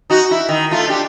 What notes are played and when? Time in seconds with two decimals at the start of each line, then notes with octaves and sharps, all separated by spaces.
0.10 D#4 F#4
0.31 E4
0.49 D#3
0.71 A3 F4
0.87 D4 G4